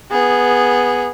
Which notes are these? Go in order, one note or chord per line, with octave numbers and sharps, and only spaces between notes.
B3 G#4